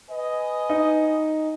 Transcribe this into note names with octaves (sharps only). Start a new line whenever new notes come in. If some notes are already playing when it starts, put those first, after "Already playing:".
B4 D#5 G#5
D#4